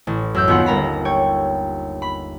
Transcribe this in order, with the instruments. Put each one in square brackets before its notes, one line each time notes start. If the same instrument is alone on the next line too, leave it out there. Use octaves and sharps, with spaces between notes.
[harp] A1
F#2 E6 G6
D#2 B3 F4 F#5
G1 A#4 A#5 B5
C#5 G5
B5